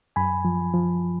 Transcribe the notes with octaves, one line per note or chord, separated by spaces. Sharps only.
F#2 G#5 B5
F3
F3